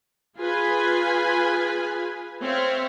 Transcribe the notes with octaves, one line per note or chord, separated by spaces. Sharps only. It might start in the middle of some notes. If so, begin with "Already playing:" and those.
F4 G#4 B4 G#5
C4 C#5 E5 F5